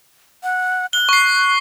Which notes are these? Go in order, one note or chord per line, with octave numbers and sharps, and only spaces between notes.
F#5
F#6 G7
C#6 C7